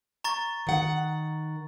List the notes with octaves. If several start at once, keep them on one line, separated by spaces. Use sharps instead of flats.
A#5 C#6 A6
D#3 F#5